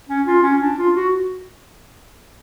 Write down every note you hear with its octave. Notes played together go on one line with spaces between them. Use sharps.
C#4
F4
C#4
D4
F4
F#4